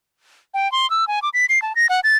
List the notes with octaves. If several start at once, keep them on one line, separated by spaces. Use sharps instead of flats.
G5
C6
E6
G#5
D6
B6
C7
A5
A#6
F#5
A6